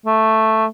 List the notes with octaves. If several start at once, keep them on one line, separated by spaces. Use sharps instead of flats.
A3